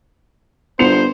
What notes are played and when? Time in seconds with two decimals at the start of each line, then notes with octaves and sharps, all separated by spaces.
0.79 G1 B3 C5 C#7 F7